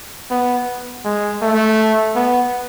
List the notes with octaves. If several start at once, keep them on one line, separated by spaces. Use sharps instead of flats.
B3
G#3
A3
B3